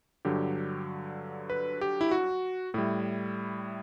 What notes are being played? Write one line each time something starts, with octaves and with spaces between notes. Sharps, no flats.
G2 D3 F#3 G4
B4
G4
E4
F#4
A2 G3 E4